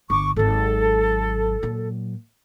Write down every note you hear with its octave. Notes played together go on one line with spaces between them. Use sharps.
G1 C#6 D6
G#1 F#3 A4
A#2 F#3